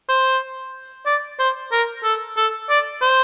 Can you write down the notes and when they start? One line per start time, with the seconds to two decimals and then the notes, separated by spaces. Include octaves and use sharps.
0.09 C5
1.06 D5
1.39 C5
1.72 A#4
2.04 A4
2.37 A4
2.70 D5
3.02 C5